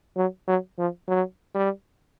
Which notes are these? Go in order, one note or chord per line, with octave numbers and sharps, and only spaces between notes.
F#3
F#3
F3
F#3
G3